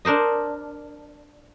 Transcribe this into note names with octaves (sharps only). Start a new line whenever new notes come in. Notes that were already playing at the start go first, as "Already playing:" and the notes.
D4 A#4 C5 D#5